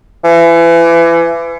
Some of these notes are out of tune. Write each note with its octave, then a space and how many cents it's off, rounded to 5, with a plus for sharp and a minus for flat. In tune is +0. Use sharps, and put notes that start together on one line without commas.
E3 +30